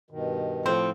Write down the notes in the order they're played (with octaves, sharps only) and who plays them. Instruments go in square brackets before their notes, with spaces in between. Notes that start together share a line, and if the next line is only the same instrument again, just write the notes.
[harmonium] G2 B2 D#3
[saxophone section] A2 F3 [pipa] C4